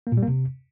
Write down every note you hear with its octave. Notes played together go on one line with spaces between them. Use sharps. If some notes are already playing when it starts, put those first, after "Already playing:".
A#3
A#2
G3
A#3
C3